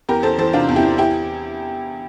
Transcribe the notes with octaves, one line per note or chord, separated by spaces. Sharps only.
E2 G4 A#4
E2 A4 C5
E3 A4 C5
C3 D4 F4
E2
E4 G4
E2
E4 G4